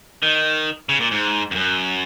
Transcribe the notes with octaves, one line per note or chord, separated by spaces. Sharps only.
D#3
C#3
A#2
G#2
F2
F#2